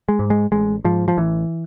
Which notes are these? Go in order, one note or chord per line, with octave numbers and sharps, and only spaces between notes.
G#3
G#2
G#3
A1 G#3
G#2 F3
F3
A1 E3